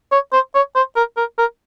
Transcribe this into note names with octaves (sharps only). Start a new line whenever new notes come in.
C#5
C5
C#5
C5
A#4
A#4
A#4